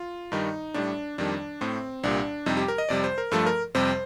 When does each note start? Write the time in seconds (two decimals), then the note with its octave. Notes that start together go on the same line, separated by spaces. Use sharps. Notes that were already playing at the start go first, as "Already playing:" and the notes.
Already playing: F4
0.32 G2 D#3 G3 D#4
0.74 A2 G3 D4
1.18 F2 D#3 G3 D4
1.61 A2 A3 C4
2.03 C2 A#2 G3 D4
2.46 F2 C3 G3 D#4
2.57 G4
2.68 A#4
2.78 D#5
2.89 F2 C3 G3 D5
3.04 C5
3.18 A#4
3.32 G2 F3 A3 A4
3.46 A#4
3.75 F2 C3 G3 C5